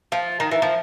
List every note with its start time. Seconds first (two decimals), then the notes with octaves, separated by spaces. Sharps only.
0.12 F3
0.40 D#3
0.51 E3
0.62 F3